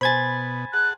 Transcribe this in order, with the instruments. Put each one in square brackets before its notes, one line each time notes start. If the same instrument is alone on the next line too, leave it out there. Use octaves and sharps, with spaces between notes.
[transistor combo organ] B2 [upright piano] C5 G#5 [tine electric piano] B5 G#6 A6
[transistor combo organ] G#4 F#5 A5 [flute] F#6